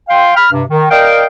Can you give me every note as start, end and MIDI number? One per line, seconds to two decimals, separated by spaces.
0.09 0.36 77
0.09 0.36 79
0.09 0.36 84
0.37 0.50 83
0.37 0.50 89
0.52 0.63 43
0.52 0.63 48
0.69 0.90 51
0.91 1.25 70
0.91 1.25 74
0.91 1.25 75
0.91 1.25 77
0.91 1.25 79